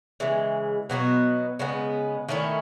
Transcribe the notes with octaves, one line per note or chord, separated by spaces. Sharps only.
C#3 E3 G#3
B2 F#3 B3 F#4
C#3 G#3 B3
D#3 A3 C#4 E4